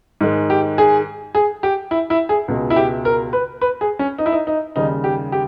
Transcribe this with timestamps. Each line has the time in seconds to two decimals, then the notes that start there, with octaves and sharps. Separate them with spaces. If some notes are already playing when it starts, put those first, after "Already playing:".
0.21 G#2 D#3 G#3
0.50 G4
0.78 G#4
1.35 G#4
1.63 G4
1.91 E4
2.10 E4
2.29 G#4
2.48 C#2 B2 G#3
2.70 E4
2.76 G4
3.05 A#4
3.33 B4
3.61 B4
3.81 G#4
3.99 C#4
4.18 D#4
4.26 E4
4.33 D#4
4.47 D#4
4.76 D#2 C#3 G3 D#4
5.04 G4
5.32 G4